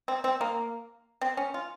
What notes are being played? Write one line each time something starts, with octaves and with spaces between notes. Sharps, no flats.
C4
C4
A#3
C4
C#4
F4